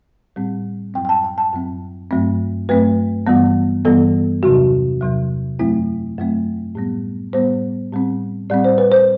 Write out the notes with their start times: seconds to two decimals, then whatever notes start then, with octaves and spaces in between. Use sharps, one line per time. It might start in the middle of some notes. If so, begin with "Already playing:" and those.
0.36 A2 G3 C4
0.94 F#2 F#3 C4 G5
1.05 G5
1.09 A5
1.24 G5
1.38 A5
1.53 F#2 F#3 C4
2.11 G2 F#3 A3 C4
2.69 G2 F#3 A3 C4 B4
3.27 G2 E3 G3 B3
3.85 G2 E3 G3 B3 A4
4.43 E2 C3 F#3 F#4
5.01 E2 C3 F#3
5.59 F#2 F#3 A3 C4 E4
6.18 F#2 F#3 A3 C4
6.75 A2 G3 B3
7.33 A2 G3 B3 C5
7.92 A2 G3 C4
8.50 A2 G3 C4 D5
8.64 C5
8.78 B4
8.92 C5